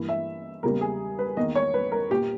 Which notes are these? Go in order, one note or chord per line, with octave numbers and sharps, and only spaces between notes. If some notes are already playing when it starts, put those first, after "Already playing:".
Already playing: G2 E3 A#3
E5
E2 C#3 G3 A#3 A#4
G#4
B4
E2 D#3 A#3 D#5
C#5
B4
A#4
A#2 A#3 G4